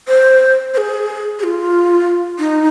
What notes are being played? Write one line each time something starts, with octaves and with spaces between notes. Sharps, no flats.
C5
C5
G#4
G#4
F4
D#4